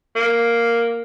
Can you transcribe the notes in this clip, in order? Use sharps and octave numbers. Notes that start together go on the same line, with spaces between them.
A#3